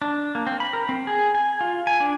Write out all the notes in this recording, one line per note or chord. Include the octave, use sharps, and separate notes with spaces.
D4
A#3
C4
B5
A#4
C4
G#4
G#5
F4
G#5
D4